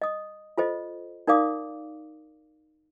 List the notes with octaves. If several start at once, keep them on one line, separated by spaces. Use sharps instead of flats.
D#5 D#6
F4 A4 C5 D#5
D#4 A#4 D5 F5 D6 D#6